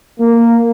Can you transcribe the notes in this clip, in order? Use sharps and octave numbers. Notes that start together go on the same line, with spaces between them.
A#3